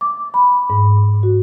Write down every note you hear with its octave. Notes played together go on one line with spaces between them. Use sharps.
D6
B5
G#2
F#4